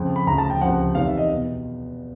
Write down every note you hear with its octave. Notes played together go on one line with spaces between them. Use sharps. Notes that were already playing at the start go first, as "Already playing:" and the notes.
Already playing: F2 C#3 F3
B5
D2 C#3 F3 A#5
A5
G5
C#2 C3 F3 F#5
E2 C3 D#3 F5
E5
D#5
B2